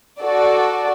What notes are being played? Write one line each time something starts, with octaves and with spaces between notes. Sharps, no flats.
F#4 A4 D5